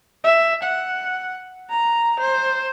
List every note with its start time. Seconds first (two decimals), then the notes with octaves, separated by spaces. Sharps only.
0.24 E5
0.63 F#5
1.70 A#5
2.20 C5